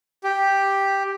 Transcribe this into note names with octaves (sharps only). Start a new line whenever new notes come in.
G4